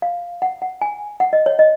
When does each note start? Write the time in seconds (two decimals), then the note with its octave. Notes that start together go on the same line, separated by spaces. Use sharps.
0.02 F5
0.42 F#5
0.62 F#5
0.81 G#5
1.20 F#5
1.33 D#5
1.46 C#5
1.59 D#5